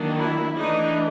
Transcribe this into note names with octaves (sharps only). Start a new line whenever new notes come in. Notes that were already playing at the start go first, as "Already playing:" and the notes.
Already playing: D#3 F#3 A#3 D4
E4
E3 A3 D4 D#4